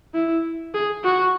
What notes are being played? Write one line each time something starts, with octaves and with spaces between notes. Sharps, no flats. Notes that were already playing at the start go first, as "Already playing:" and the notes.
E4
G#4
F#4